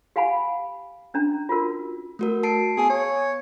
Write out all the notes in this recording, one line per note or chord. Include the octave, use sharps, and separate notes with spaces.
G4 F5 F#5 G#5 B5
C#4 D4 A#5
F4 F#4 A#4
A3 F#4 A#4
A5 C7 D7
B3 G#4 G#5
C#5